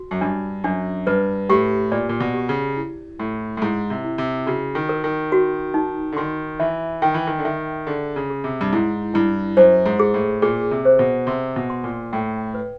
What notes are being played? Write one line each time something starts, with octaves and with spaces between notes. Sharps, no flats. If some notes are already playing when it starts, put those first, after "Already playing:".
Already playing: F#4
F#2
G2 D4
F#2 D4
G2 B4
A2 G4
A#2 D5
A#2
B2
G4
C#3
E4
A2 E4
A2
G#2 E4
C3
E4
C3
C#3 F#4
D#3
A#4
D#3
F#4
D#4
D3
D#3 C6
E3 E5
D#3 G5
E3
D#3
D3
D#3 E5
D3 G#4
C#3
G#4
C3
G2
G#2 E4
G2 E4
F#2 C5
G#2
G#4
A2
A#2 G#4
C3
C5
B2
C3 C6
B2
C6
A#2
A2 G5
B4